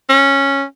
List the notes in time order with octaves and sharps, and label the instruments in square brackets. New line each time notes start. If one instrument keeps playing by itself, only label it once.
[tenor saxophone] C#4